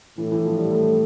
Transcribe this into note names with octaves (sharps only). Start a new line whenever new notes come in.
A2 E3
E3
F3
G3
A3